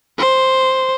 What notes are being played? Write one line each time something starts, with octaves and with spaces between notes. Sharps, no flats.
C5